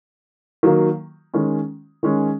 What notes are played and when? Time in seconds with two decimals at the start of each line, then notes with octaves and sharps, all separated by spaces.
0.63 D#3 F#3 A#3
1.34 D#3 G#3 C#4
2.03 D#3 G#3 C#4